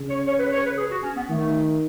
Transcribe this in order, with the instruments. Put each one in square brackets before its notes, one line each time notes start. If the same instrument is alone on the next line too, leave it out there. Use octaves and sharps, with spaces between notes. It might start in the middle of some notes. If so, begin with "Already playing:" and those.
Already playing: [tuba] C#3
[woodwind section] C#5
C#5
B4
C#5
B4
G#4
F#4
C#4
B3
[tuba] D#3 [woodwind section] A3